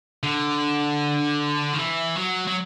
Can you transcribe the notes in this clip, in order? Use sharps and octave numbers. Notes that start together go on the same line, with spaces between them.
D3
D#3
E3
F#3
F#3